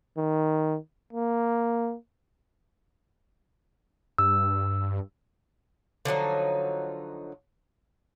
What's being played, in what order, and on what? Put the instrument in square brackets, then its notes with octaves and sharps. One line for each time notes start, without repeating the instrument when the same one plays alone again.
[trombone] D#3
A#3
[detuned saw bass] G2 [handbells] E6
[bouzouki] D3 F3 F#3 D#4